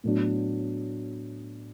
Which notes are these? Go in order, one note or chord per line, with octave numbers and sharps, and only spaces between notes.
A2 F#3 B3 D4